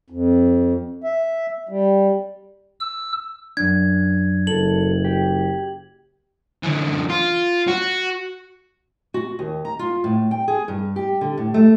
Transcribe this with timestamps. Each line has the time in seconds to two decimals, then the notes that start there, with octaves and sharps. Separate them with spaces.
0.10 F2
1.04 E5
1.69 G3
2.80 E6
3.57 F#2 D4 G#6
4.47 F#1 A4 F#7
5.04 G4
6.63 D3 E3
7.09 F4
7.68 F#4
9.14 F#4
9.39 D#2
9.65 A#5
9.79 F4
10.04 A2
10.31 G5
10.48 G#4
10.68 G2
10.96 G4
11.21 D3
11.37 A2
11.54 A3